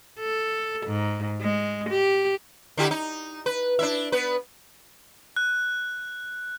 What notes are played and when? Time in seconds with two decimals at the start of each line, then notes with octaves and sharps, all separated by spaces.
0.20 A4
0.87 G#2
1.41 G#3
1.90 G4
2.77 D3 E4 G4
2.91 D#4
3.46 B4
3.79 D4 E4 E5
4.12 B3 B4
5.36 F#6